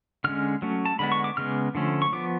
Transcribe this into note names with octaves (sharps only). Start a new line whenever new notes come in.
D3 G#3 C#4 F6
F#3 A3 C#4
A5
D3 G#3 B3 B5
C#6
D6
C#3 G#3 B3 F6
D3 F3 A3 C#4
C#6
F3 B3 D6